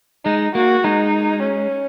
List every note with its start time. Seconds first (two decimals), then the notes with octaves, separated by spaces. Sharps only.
0.25 G#3 D#4
0.55 A#3 F#4
0.84 G#3 D#4
1.43 C#4